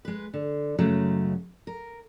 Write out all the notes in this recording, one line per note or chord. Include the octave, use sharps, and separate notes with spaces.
G#3 B4
D3
F#2 C#3 F#3 G#3 A3
A#4